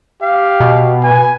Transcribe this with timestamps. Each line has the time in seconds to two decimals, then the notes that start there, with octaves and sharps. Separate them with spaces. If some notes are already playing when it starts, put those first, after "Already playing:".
0.22 G4 F5
0.60 B2
1.03 B4 G#5